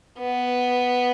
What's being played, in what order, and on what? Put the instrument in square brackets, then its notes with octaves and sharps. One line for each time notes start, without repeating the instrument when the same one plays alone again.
[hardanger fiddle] B3